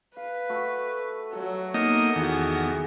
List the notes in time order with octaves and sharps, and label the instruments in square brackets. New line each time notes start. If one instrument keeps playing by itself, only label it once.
[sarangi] B4 [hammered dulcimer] F5
[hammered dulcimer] A3 F#4
[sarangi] F#3 [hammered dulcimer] A4
[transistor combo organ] A#3 D#4 D#5 [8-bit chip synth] B3
[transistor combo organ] E2 D#3 [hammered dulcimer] A2 G#4 [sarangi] F#4